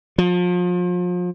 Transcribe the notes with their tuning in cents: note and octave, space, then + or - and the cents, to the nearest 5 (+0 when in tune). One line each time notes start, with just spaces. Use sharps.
F3 +35